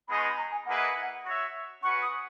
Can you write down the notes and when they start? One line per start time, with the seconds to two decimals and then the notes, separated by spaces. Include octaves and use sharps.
0.08 G#3 B3 D#4 G#4 D#5 B5
0.17 C#6
0.22 B5
0.38 A#5
0.51 G#5
0.66 A#3 E4 G#4 B4 D#5 F#5
1.24 F#4 C#5 E5
1.83 C#4 F#4 B4 F#5 C#6
2.02 D#6